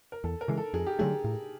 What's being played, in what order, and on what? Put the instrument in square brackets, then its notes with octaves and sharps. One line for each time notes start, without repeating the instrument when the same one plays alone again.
[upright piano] A#4
[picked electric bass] E2 [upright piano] A4
[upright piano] A#4
[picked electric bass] C#3 E3 G#3
[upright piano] A4
[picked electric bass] F2 [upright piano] G#4
[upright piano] G4
[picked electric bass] D3 F#3 A3 [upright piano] G#4
[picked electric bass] A2